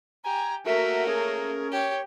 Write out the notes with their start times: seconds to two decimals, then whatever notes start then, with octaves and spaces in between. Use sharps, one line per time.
0.24 G4 G#5 A#5
0.66 A3 A#3 F#4 A#4 E5
1.07 C#4 G#4
1.72 G4 C#5